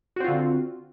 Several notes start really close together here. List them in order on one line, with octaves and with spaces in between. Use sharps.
F#4 C4 F4 D3